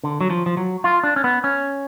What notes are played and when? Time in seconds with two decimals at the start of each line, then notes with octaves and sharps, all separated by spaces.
0.04 D3
0.21 F#3
0.30 F3
0.46 F3
0.57 F#3
0.84 F4
1.04 D4
1.16 C#4
1.24 B3
1.44 C#4